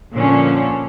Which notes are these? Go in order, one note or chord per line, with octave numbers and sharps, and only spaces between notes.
A#2 D3 F3 C#4 D4